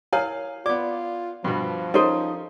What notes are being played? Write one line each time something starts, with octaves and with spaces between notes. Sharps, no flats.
E4 A#4 C#5 F5 G#5
B3 F4 D5 D6
G2 B2 F3
C#4 D#4 A4 A#4 C5 D#5